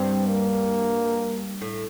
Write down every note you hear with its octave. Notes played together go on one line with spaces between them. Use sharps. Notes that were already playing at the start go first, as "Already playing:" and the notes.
Already playing: G2 C4
A#3
A2